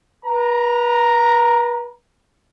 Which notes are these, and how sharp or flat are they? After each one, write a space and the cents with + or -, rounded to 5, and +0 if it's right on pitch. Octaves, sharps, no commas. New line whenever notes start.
B4 -40 A#5 +0